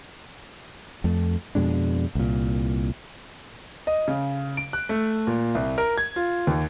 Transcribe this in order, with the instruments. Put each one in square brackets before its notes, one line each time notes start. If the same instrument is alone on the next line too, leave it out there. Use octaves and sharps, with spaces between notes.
[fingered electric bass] F2 A3
F2 B2 G#3 D4
C2 A#2
[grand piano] D#5
C#3
D7
F#6
A3
A#2
C2
A#4
G#6
F4
D#2